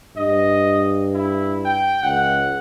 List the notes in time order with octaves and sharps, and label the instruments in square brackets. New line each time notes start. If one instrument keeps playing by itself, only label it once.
[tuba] G2 [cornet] D#5
[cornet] E4
G5
[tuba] C#2 [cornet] F#5